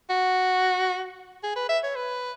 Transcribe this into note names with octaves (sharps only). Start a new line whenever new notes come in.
F#4
G#4
B4
E5
C#5
B4